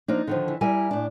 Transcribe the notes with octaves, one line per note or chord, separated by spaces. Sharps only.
F3 A#3 D4 D#4
D3 D#3 F3
E3
G3 E4 A#4 G#5
A2 D4